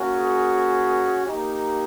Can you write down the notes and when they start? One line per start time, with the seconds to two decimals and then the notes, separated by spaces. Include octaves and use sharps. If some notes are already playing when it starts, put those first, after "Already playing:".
Already playing: A#3 C#4 F#4
0.15 G#4
1.25 A#3 D#4 G4